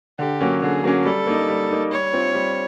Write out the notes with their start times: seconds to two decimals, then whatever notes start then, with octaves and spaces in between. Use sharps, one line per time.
0.19 D3 G4
0.40 F#3 A#3 C#4
0.62 D3 G#4
0.84 F#3 A#3 C#4
1.05 G3 A4
1.27 A#3 D#4
1.48 G3
1.70 A#3 D#4
1.91 G3 C#5
2.13 C4 F4
2.34 G3